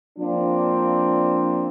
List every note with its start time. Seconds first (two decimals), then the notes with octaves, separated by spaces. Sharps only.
0.18 F3 A#3 C4 D4